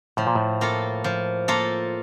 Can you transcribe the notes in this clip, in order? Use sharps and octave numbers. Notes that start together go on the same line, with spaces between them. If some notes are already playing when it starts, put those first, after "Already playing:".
A2 F3
A#2
A2
A#3 F4 A4
F3
A#3 F4 A4